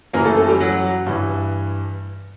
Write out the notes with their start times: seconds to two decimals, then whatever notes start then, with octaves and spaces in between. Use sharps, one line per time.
0.13 F#2 C#3 E3 A#3 A#4
0.25 A3 A4
0.37 A3 A4
0.48 G3 G4
0.60 F#3 F#4
1.06 G2 E3